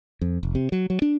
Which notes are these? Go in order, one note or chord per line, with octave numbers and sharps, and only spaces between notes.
F2
F1
C3
F#3
F#3
D4